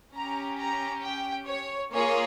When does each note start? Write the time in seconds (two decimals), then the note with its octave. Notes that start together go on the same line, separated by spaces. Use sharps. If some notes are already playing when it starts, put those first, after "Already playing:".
0.13 C#4 G4 A#5
0.58 A#5
1.03 G5
1.48 C#5
1.92 A#3 F4 G#4 C#5